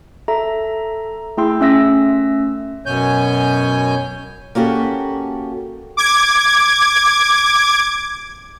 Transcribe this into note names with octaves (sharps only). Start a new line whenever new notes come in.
A4 E5 A#5
A3 E4 G#4 G5 C6 E6
A3 C#4 E5 E6 A#6
F#2 B2 C#5 G#5 G6
A#3 C#4 F#4 G4 A4
D6 G#6